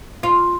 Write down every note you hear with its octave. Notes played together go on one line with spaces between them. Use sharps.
F4